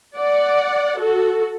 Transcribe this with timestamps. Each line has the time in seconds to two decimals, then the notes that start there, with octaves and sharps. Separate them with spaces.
0.17 D5 F#5
0.99 F#4 A4